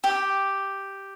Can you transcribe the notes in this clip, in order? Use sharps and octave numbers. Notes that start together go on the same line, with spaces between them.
G4